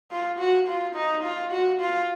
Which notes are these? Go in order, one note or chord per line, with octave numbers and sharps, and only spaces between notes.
F4
F#4
F4
D#4
F4
F#4
F4